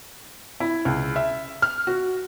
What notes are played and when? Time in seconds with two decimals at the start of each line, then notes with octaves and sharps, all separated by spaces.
0.60 E4
0.85 C#2
1.16 E5
1.62 F6
1.87 F#4